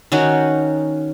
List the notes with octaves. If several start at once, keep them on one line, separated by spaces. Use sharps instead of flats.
D#3 C#4 D#4 F#4